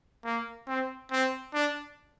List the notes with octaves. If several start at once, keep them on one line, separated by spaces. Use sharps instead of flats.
A#3
C4
C4
D4